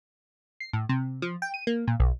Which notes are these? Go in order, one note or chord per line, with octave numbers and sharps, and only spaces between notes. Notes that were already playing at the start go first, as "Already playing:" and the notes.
C7
A2
C3
F3
G5
D#7
A#3
A#2
B1